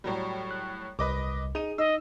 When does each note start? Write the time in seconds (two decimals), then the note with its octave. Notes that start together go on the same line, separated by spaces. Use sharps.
0.04 A2 F#3 G3
0.51 F#6
0.99 C2 B4 D#5 D6
1.55 D#4 G#4 D#7
1.78 D#4 D#5 E6